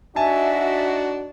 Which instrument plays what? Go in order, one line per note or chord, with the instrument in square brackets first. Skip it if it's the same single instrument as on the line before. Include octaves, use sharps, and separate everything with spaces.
[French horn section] D4 D#4 F#4 [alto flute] E5 [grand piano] G#5 A5